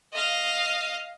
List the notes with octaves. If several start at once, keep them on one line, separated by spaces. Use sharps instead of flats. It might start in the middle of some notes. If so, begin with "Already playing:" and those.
D#5 F5